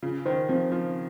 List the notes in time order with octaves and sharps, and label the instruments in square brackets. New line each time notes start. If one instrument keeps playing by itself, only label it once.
[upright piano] C#3 [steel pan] F4
[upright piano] D#3 [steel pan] C5
[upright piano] F3 [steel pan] C4
[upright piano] F3 [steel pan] C4